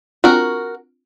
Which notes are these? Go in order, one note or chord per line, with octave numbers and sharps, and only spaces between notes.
C4 D4 F4 F#4 A#4